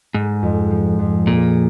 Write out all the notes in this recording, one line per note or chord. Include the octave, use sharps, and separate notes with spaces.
G#2 G#3
F2
F3
F2
A#2 G#4